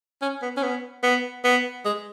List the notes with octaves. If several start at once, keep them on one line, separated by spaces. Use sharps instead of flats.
C#4
B3
C#4
B3
B3
B3
G#3